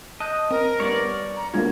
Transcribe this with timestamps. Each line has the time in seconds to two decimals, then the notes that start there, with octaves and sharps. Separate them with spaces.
0.20 D#5 A5 F#6 G6
0.51 C4 A#4
0.80 G2 B3 C#5 D5
1.37 A#5
1.54 G2 B2 G#3 A#3 D4 F4 G#6